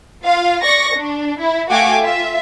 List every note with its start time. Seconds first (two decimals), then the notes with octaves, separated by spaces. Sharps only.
0.23 F4 F5
0.63 D5 C#6 A#6
0.95 D4
1.39 E4
1.70 A3 F#4 F5 G5 G#5 D6
2.02 F4 E5